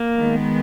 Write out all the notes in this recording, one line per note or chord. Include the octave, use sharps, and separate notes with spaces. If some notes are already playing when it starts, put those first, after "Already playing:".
Already playing: A#3
D#3 G#3 B3